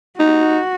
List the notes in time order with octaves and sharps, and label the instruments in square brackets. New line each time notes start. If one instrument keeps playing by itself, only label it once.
[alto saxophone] D#4 [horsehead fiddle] F#4